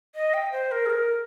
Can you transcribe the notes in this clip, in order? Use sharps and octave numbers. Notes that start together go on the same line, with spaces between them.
D#5
G5
C5
A#4
G#4
A#4